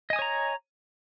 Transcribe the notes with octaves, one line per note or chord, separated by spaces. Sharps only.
C#5 D#5 G#5 A#5 D#6